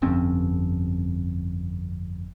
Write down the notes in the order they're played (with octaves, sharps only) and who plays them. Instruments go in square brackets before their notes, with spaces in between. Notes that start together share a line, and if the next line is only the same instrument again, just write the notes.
[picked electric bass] G1 F2 C4 C#4